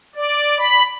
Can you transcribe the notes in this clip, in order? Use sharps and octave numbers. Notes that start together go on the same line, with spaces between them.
D5
B5